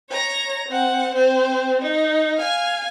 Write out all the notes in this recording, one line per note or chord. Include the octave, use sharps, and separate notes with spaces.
C#5 A#5
C4 F#5
C4 C5
D#4
F5 G#5